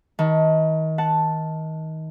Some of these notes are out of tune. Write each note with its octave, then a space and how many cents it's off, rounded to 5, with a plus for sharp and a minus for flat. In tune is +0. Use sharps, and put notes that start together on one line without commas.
D#3 +30 A5 +20
F#5 +0 A5 +0